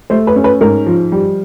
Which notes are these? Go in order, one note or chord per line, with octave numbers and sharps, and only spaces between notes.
A3 C5
B4
C#4
B4
G#2 A#4
F3
G3